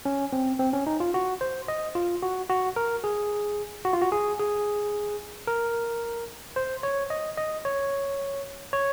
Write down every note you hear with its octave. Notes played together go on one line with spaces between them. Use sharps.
C#4
C4
C4
C#4
D#4
F4
F#4
C5
D#5
F4
F#4
F#4
A#4
G#4
F#4
F4
F#4
G#4
G#4
A#4
C5
C#5
D#5
D#5
C#5
C#5